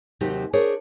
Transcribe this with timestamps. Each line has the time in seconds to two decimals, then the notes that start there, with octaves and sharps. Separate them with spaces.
0.21 D#2 C3 F#3 D#4 F#4 G4
0.53 D4 G#4 A#4 C5 C#5